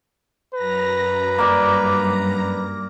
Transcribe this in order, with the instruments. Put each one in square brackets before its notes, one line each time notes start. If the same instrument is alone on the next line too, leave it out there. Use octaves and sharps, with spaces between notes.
[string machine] F#2 A#5 A#6 [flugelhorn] B4
[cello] G2 [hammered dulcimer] A#3 D5 D6